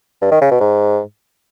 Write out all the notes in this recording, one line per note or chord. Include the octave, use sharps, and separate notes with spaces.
G2
D#3
C#3
B2
G#2